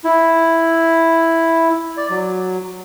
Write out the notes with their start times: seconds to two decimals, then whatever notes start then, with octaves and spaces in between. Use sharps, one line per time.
0.04 E4
1.97 D5
2.10 F#3